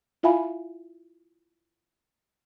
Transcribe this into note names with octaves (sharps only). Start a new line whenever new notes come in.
E4 F4 E5 F5 G#5 B5